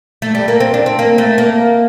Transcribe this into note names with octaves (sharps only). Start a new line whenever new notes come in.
A3
G3
A#3
C4
D4
C4
A#3
A3
A#3